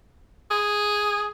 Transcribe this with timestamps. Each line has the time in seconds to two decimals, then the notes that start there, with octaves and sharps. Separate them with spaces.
0.51 G#4